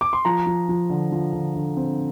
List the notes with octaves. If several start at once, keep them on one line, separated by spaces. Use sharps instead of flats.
D6
C6
F3 A#5
F3
F3
D3
F3
D3
D3
C4